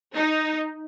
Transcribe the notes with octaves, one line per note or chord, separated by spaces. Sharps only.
D#4